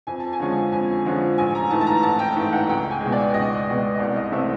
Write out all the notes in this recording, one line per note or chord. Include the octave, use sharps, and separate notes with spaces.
F2 G#5
A5
G#5
D3 F3 G#3 C#4
F2 G#5
D3 F3 G#3 C#4
A1 G#5
A#5
G#2 E3 A3 A5
A5
A#5
A1 A5
G5
G#2 E3 A3
F#5
C#2 G5
G#5
G#3
B2
D5
C#2 D#5
B2 G#3
D#5
C2 D5
D#5
C3 E3 A3 C4 E5